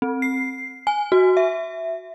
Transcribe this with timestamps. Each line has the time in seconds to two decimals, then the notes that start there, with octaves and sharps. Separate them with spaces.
0.02 C4
0.22 C7
0.87 G#5
1.12 F#4
1.37 E5